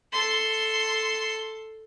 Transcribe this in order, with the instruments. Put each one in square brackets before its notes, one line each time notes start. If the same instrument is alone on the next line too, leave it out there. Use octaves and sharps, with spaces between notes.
[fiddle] A4 C6